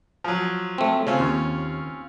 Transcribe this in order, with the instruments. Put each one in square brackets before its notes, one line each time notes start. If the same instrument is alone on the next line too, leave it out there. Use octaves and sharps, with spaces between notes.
[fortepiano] F3 F#3
[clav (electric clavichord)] A3 C4
[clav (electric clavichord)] C#3 [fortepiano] C4 C#4 F4
[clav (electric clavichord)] D#2